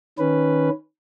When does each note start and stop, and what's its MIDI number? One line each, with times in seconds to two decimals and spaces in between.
0.19 0.70 51
0.19 0.70 61
0.19 0.70 71